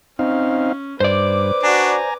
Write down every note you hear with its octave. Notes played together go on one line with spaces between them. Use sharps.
C4 C#4 D#4 F5
G2 B4 C5 D5 D6
D4 F#4 G#5 A#5